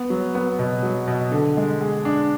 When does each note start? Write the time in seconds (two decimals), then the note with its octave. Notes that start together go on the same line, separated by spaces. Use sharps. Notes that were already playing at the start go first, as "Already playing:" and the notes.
Already playing: B3
0.10 F#3
0.35 B3
0.59 B2
0.83 F#3
1.07 B2
1.31 D3
1.57 G#3
1.81 G#4
2.05 D4